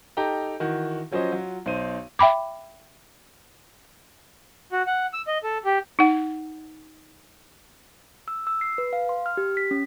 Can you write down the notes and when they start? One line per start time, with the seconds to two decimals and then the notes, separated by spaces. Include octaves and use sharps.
0.17 D#4 G4 A4 G5 A#5
0.60 D#3 E3 F#4
1.11 F3 F#3 C#4 C5 D#5
1.32 F#3 F4
1.66 B1 D#4 C5 D#7
2.19 E5 G5 B5 D6
4.72 F#4
4.87 F#5
5.13 E6
5.27 D#5
5.43 A4
5.65 G4
5.99 D#4 F#5
8.28 E6
8.47 E6
8.61 C7
8.78 B4
8.93 F5
9.09 C6
9.26 F6
9.37 G4
9.57 B6
9.71 C#4